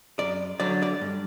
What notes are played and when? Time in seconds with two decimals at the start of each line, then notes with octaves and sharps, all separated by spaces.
0.19 F#2 D5
0.60 D3 F#3 D5
0.83 D5
1.01 G2